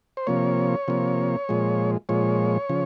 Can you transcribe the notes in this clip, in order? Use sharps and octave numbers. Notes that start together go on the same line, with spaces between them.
C5
C3 F3 A#3 C#5
C3 F3 A#3
A#2 F3 G#3
A#2 F3 G#3 C#5
C#3 F3